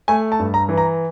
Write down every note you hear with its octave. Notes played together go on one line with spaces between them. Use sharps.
A3 G#5
A5
G2
A#5
E3
A#5